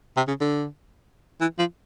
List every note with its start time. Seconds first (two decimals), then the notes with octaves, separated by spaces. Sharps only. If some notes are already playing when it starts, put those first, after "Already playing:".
0.17 C3
0.28 C#3
0.41 D3
1.41 E3
1.59 F3